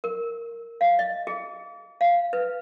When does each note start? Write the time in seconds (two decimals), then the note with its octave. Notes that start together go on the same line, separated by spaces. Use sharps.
0.04 A#4
0.81 F5
0.99 D#5
1.27 G#4
2.01 F5
2.33 B4